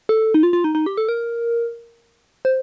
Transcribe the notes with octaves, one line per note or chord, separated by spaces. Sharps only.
A4
D#4
F4
F4
D#4
D#4
G4
A4
A#4
C5